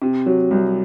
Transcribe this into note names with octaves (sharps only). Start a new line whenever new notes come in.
C3
F#3
C2